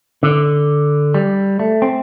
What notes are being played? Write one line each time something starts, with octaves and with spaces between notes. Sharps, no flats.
D3
G3
A3
C4